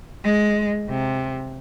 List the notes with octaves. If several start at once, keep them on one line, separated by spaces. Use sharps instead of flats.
G#3
C3